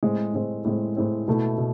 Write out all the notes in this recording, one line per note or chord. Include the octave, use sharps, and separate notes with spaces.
A2 G#3 C4
A2 G#3 C4
A2 G#3 C4
A2 G#3 C4
B2 A3 E4
B2